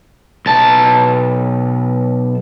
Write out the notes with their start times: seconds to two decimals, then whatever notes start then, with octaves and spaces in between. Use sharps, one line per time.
0.46 B1 A5